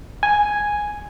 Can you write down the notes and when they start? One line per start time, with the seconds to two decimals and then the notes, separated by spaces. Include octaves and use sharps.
0.23 G#5